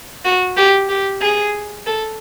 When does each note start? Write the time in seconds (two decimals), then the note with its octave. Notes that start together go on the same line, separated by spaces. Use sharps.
0.25 F#4
0.57 G4
0.89 G4
1.22 G#4
1.86 A4